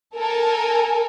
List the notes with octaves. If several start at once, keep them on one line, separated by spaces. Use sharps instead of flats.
A4 A#4 G#5